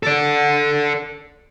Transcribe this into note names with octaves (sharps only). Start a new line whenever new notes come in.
A4 D5